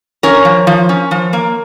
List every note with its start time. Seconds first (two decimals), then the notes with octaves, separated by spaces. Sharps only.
0.23 C#4 A#4 C#5
0.45 F3
0.67 F3
0.89 C#4
1.11 F3
1.33 A#3